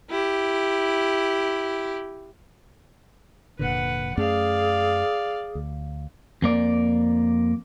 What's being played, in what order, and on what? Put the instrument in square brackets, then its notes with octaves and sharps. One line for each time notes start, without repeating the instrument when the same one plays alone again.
[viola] E4 G4
[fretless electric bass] F1 A#2 D3 [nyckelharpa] B4 F#5
[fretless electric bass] F#2 A3 C#4 [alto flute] G#4 [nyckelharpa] D5 F5
[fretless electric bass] D2
[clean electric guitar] F2 A#3 D5